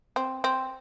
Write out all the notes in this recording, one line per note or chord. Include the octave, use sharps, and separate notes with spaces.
C4
C4